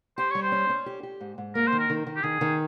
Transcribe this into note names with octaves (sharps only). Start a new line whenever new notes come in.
G4 C5
G3 C#5
C5
C#4
C#4
G4
G4
G#2
G#2
A#3 A#4
C5
D#3
A#4
D#3
D#3
G4
D#3 G#4
D#3